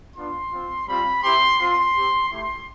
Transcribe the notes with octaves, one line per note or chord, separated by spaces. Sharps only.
B3 D4 F4 C6
C4 F4
G3 C4 F4 B5
C4 E4 G4 C6
C4 F4 C6
C4 G4
A3 E4 G4 C6